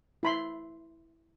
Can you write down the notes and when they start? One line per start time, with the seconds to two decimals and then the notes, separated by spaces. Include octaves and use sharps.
0.23 E4 B5 C6